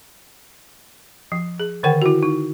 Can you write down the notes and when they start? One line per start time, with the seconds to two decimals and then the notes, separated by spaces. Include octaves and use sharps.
1.32 F3
1.60 G#4
1.83 D3 D#3 A#4 F#5 G5
2.02 E4 F#4
2.23 D#4